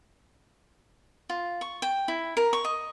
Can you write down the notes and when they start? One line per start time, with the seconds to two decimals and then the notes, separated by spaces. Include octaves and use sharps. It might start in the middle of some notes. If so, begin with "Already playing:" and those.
1.29 F4
1.61 C#6
1.82 G5
2.08 E4
2.37 A#4
2.53 C#6
2.64 D#5